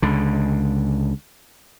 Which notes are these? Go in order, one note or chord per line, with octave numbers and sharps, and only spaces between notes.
C#2 D3